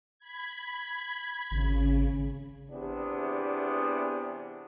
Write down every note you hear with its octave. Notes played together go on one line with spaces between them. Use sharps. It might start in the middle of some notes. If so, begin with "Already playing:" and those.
B5 G#6
G#1 C#3
E2 C3 B3 D4